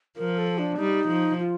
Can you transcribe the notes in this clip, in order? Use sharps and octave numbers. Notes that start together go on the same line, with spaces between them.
F3 A#4
A4
D4
G3 D#4
F3
F4